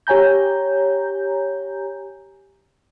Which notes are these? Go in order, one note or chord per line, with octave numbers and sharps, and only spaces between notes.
G4 C#5 G#5 A#5 G6